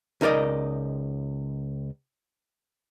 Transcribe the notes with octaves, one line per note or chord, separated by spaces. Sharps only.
C#2 D#4 A#4 D5 D#5